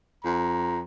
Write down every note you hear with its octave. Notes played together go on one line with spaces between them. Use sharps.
F2 A#5